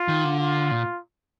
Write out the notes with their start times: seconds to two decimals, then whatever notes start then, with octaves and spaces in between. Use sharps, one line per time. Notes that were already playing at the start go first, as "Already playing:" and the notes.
Already playing: F4
0.08 D#3
0.24 D3
0.39 F4
0.71 A#2